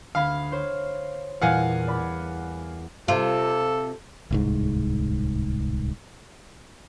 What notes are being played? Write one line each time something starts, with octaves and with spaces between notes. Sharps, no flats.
D2 F5 B5 G#6
C5 C#5
E2 A#2 G3 F5 F#5 G#5
D5 B5
C3 F4 A4
D1 C2 G#2